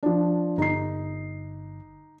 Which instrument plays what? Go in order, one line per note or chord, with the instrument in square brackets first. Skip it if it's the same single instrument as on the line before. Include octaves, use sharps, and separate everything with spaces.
[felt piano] F3 D4
[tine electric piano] G1 [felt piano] D#4 C7